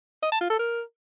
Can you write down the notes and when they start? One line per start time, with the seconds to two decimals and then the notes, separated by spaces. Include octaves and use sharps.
0.22 D#5
0.32 A5
0.41 F4
0.50 A4
0.59 A#4